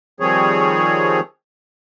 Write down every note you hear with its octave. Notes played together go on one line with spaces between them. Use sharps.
D#3 F3 G3 C4 G#4 C#5